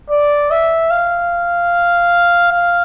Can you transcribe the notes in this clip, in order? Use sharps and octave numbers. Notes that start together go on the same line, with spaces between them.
D5
E5
F5
F5